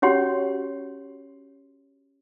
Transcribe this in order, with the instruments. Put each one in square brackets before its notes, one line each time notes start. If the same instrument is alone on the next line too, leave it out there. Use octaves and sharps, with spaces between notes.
[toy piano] C#4 F#4 G4 C#5 F#5 C6